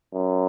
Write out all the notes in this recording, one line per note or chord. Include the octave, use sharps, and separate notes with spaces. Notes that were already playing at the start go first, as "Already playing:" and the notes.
F#2